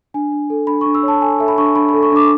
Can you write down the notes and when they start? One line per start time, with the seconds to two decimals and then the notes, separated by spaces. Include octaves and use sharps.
0.14 D4 G#5
0.32 D4
0.50 A4
0.67 D4 B5
0.81 D4 C#6
0.95 E6
1.03 C#5
1.08 A5
1.22 A4 G#5
1.39 A4 E5
1.48 B5
1.58 D4 C#6
1.75 D4 B5
1.89 A4 B5
2.03 C#6
2.12 D4 D6